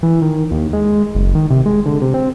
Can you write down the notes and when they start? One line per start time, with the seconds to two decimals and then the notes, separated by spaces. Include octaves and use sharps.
0.03 E3
0.21 D#3
0.51 D#2
0.73 G#3
1.15 F#1
1.35 D#3
1.50 C3
1.66 G#3
1.86 D3
2.02 C3
2.14 C4